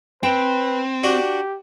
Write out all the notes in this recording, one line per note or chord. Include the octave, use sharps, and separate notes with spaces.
C4 B4 G5
D4 F#4 G4